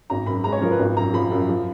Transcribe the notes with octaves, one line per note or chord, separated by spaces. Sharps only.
G#1 A#5
F#2 B5
G#3 A#5
C#5
F3 A#4
B4
G#1
F#2 A#5
F3 B5
F#2
F3